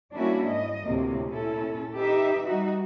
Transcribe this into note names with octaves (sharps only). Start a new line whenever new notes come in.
G3 A#3 C#4 D4 E4 F#4
G#2 D#5
D2 A2 C3 A#3
A#2 C#4 E4 A4
D#4 G4 B4 E5
G3 D#4 F#4